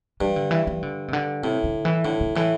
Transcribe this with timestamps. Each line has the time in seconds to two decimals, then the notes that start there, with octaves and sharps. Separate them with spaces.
0.20 G2 E3
0.36 D3
0.51 E3
0.67 E3
0.83 D3
1.08 C3
1.13 D3
1.43 A2 C3
1.64 D3
1.85 E3
2.05 A2 D3
2.21 D3
2.36 A2 E3